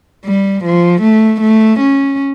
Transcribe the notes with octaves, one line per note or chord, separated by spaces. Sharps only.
G3
F3
A3
A3
C#4